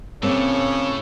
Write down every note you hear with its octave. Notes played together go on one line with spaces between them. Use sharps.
A2 C#3 A#3 C4 A4 C#5